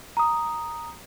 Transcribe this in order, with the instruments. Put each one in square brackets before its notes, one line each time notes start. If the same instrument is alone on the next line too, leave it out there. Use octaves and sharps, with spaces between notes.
[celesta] A#5 D#6